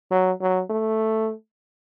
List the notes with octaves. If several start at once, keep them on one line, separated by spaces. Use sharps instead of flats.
F#3
F#3
A3